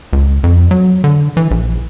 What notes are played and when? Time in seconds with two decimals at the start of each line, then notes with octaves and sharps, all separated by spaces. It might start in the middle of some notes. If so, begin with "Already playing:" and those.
0.13 C#2
0.44 F2
0.71 F#3
1.04 D3
1.37 E3
1.51 A#1